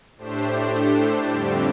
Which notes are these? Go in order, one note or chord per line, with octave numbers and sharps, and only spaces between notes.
A2 A3 D4 G4 C5
F2 D3 G3 C4 G4